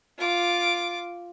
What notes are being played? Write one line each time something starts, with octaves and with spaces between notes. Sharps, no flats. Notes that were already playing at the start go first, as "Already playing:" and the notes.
F4 D6